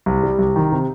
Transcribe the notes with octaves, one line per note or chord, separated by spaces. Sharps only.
C2
G3
C2
D#3
C3